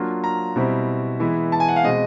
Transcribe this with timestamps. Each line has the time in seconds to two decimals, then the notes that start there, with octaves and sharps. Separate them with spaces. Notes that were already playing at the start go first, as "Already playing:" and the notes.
Already playing: F#3 A#3 D4 F4
0.24 A#5
0.56 B2 G3 C4 E4
1.20 E3 G#3 B3 E4
1.52 A5
1.60 G#5
1.68 F#5
1.76 F5
1.84 B2 G#3 C4 D#5